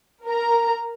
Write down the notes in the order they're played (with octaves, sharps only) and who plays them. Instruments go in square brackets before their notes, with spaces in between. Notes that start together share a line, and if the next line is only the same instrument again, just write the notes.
[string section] A#4 A#5